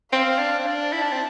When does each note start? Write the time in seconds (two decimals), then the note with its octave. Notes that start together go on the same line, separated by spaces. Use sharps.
0.12 C4 F5
0.38 D4
0.59 C4
0.66 D4
0.93 E4 A5
1.03 D4
1.12 C4